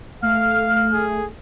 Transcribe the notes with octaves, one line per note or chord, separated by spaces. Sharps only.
A3 F5 F6
G#4